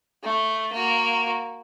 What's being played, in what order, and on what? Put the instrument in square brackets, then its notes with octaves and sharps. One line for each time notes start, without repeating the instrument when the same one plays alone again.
[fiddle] A3
A#3 F#4